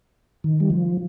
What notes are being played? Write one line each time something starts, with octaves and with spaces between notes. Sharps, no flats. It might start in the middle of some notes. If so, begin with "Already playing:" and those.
D#3
G3
F3